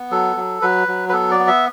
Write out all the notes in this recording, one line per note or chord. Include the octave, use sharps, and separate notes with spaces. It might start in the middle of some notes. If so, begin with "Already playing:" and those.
Already playing: B3
F#3 A4
F#3
F#3 B4
F#3
B4
B3 A4
D5
B3
E5